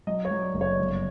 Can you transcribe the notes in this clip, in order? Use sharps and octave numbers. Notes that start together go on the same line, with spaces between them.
F#3 D#5
C#5
F#3
D5
F#1
C#5
G1